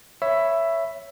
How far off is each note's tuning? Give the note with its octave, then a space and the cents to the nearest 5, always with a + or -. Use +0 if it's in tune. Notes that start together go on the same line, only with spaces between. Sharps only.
C#5 +0 E5 +10 B5 +0